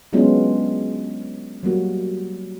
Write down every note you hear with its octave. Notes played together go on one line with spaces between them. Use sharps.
F#3 G#3 B3 C#4 D4 F4
F#3 G3 A#3 F#4